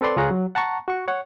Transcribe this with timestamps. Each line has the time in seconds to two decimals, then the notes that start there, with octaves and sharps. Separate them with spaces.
0.01 C4 A4 B4 D5 C6
0.16 C#2 F4 G#4 C#5 A#5 F#6
0.31 F#3
0.55 F#5 A5 A#5 C#6
0.88 F#4 C#6
1.08 C#5 F#5